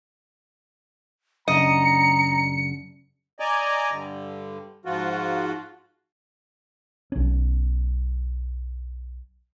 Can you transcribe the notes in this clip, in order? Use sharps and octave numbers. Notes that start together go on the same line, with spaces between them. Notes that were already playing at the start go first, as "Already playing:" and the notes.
F#2 C#3 D4 D#5 A#5 C#7
D5 D#5 G#5 A#5
G2 D3
G#2 F3 F4 F#4
B1 C#4